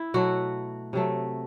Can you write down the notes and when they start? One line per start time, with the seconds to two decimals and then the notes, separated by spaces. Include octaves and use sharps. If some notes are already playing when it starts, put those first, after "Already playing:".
Already playing: E4
0.14 B2 F#3 A3 F#4
0.93 C3 F#3 A3